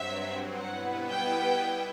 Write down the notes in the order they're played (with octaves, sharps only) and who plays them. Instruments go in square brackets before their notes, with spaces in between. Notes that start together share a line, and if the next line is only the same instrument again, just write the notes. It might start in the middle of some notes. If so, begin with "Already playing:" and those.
Already playing: [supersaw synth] G2 F#3 C4 [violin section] E5
[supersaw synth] B2 G3 B3 E4 B4 [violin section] F#5
[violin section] G5
[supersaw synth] E4